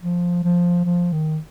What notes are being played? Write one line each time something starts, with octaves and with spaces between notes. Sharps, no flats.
F3
F3
F3
D#3